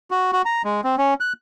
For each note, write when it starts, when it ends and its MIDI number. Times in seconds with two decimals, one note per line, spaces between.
0.11 0.31 66
0.32 0.42 66
0.45 0.62 82
0.65 0.81 56
0.84 0.96 60
0.98 1.14 61
1.20 1.33 90